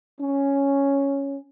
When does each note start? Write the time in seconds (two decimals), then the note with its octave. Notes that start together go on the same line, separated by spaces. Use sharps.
0.20 C#4